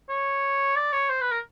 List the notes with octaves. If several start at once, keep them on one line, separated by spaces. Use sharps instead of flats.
C#5
D5
C#5
C5
B4
A#4